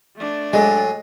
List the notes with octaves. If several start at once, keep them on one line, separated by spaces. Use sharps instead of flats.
A3 D4
A2 F#3 G#3 G#5